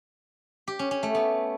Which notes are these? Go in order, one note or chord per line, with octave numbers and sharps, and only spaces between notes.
G4
C#4
C#4
A3
B3